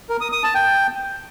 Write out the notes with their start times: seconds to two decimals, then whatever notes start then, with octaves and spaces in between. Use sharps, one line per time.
0.09 A#4
0.21 D#6
0.32 D#6
0.43 A5
0.55 G5